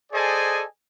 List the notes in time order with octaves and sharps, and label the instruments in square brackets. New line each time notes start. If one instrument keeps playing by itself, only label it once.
[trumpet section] G#4 A4 C5 D5 D#5 G#5